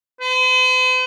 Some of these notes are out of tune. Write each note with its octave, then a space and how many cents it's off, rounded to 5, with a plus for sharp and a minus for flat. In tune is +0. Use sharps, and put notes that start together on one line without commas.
C5 -45